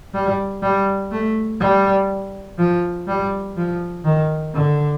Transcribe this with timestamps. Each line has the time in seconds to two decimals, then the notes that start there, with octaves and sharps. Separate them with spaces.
0.14 G3
0.62 G3
1.12 A3
1.60 G3
2.59 F3
3.08 G3
3.57 F3
4.05 D#3
4.55 D3